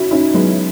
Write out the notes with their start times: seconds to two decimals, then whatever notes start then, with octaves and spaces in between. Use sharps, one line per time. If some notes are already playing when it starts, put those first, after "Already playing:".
Already playing: C#4 E4 F#4
0.11 C#4 D#4 E4
0.34 F#3 G#3 B3